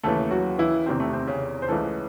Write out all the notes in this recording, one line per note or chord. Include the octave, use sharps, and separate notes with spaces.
D#2 C#3 E3 A3 A4
F#3 F#4
E3 E4
E2 C3 D#3 C4
A3
C4
C#3 C#4
C5
C#2 C#3 E3 A3 A4